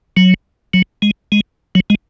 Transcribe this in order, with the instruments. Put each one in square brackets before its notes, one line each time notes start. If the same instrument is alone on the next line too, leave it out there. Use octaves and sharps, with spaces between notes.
[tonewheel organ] F#3
F#3
G#3
G#3
F#3
G#3